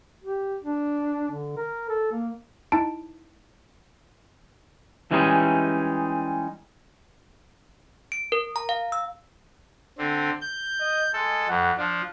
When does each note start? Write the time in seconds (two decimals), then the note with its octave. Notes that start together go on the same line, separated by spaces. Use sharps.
0.24 G4
0.64 D4
1.31 D3
1.57 A#4
1.89 A4
2.12 A#3
2.72 D#4 E4 A5 D7
5.11 E3 G3 G#3 C#4 D#4
8.12 D7
8.32 A#4
8.56 A#5
8.69 F5
8.92 E6
9.98 D3 C4
10.42 G6
10.80 D#5
11.13 G#3 A4
11.48 F2 F#5
11.78 F3 D4